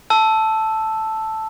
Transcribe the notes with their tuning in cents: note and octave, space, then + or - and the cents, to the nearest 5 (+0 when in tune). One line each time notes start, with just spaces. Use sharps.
A5 +0 E6 +0